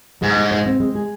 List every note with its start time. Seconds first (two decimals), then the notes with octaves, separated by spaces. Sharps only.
0.22 G#2 G#3
0.37 G#4
0.51 C5
0.66 C4
0.80 G#3
0.95 G#4